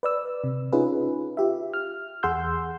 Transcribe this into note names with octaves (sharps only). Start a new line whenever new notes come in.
B4 D5 E6
C3
C#4 D#4 F4 G#4 B4
F4 G4 E5
F6
E2 G#4 F#5 C6 E6 G6